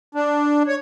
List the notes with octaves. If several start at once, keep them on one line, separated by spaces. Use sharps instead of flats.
D4
C#5